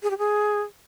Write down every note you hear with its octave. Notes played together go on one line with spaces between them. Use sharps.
G#4
G4
G#4